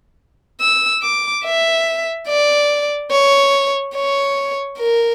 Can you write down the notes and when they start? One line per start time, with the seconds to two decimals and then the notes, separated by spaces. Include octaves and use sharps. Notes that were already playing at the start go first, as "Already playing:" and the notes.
0.61 E6
1.02 D6
1.44 E5
2.28 D5
3.11 C#5
3.96 C#5
4.79 A#4